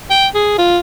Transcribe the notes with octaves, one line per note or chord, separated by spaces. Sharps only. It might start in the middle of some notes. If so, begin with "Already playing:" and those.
G5
G#4
F4